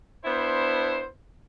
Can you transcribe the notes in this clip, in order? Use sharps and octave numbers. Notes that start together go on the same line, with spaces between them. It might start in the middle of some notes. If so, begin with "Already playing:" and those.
B3 D4 E4 C5